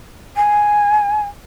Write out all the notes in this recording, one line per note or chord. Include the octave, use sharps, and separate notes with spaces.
G#5